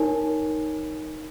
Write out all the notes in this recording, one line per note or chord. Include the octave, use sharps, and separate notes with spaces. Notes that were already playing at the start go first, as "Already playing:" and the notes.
Already playing: D#4 A#4 C#5 G#5